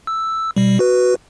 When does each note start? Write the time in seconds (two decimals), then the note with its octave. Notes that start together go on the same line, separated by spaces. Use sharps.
0.07 E6
0.56 B2 G3
0.79 F#4 B4